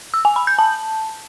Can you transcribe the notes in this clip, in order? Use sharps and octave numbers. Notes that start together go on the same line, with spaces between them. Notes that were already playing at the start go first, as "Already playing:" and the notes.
E6
G#5
B5
G6
A5